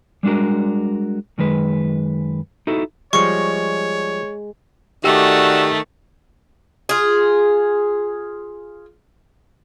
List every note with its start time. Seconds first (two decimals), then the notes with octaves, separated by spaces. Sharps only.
0.23 G3 G#3 D4 F#4 A#4
1.38 F#2 D#3 G#3 B4
2.67 D#4 E4 F#4 A4
3.13 F3 G3 G#3 C#5 C#6 C#7
5.04 D#3 A3 F#4 G4 D5 G5 E6
6.89 F4 G#4